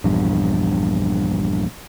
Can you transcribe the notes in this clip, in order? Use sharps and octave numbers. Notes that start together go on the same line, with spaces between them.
A#1 E2 G2